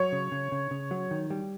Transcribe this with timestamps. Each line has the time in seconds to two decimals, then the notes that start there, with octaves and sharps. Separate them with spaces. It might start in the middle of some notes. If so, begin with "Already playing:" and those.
Already playing: F#3 C#5
0.12 C#3
0.32 C#3
0.52 C#3
0.71 C#3
0.91 F#3
1.11 D#3
1.30 G3